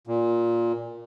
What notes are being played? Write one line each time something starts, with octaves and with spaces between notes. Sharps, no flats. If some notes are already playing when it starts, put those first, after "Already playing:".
A#2